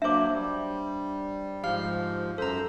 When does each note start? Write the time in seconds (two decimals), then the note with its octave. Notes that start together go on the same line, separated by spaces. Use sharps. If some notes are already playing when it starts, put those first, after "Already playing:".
0.02 F#3 A#3 D4 C5 E5 D6
0.33 G3
1.63 G#2 F3 G4 F5 F6
2.38 F#2 A4 C5 A#5